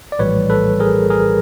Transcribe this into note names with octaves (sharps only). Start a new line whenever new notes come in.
D5
A#1 A2 E3 G3 B4 C#5
A4 B4
G#4 A#4
G#4 A#4